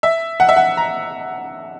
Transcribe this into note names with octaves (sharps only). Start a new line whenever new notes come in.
E5
F#5
E5
F#5
A#5